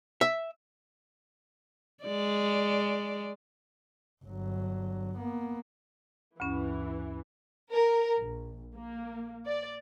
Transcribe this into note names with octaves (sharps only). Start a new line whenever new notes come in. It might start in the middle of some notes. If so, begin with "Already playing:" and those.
E5
G#3 D5
G1 F#3
A#3 B3
D2 G2 E3 C#4
A#4
A#1
A#3
D5